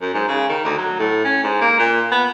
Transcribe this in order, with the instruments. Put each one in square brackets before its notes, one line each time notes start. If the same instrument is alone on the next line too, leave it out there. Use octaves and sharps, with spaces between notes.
[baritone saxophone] F#2
G#2
C#3
D#3
D2
F#3
A2
C#4
G#2
A#3
A#2
B3